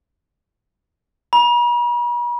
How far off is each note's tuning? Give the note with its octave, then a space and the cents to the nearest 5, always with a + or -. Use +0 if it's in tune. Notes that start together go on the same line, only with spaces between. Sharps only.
B5 -45